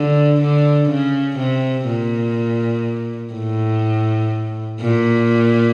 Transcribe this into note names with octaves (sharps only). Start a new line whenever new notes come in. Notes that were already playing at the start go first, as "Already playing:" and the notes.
Already playing: D3
D3
C#3
C3
A#2
A2
A#2